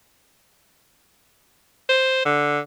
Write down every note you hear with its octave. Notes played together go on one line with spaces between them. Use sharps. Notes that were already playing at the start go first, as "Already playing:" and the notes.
C5
D3